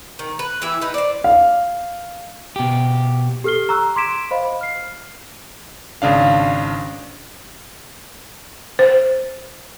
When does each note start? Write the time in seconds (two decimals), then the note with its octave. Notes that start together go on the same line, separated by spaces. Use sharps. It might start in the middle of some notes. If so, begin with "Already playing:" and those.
0.19 D#3
0.39 B4
0.62 E3 E4 G4 E5
0.81 D#4 B4
0.94 C5 D5
1.24 F5
2.56 B2 G4
3.44 G4 A4 F6 C7 G7
3.69 A#5 C#6 E6 F#6
3.96 C6 D6 G#6 B6 D7 E7
4.31 C5 D#5 F5 B5
4.61 F6 C7
6.02 G#1 C#3 D4 F5
8.79 C5